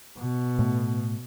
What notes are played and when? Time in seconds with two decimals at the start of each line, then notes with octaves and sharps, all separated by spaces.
0.18 B2
0.59 A2 A3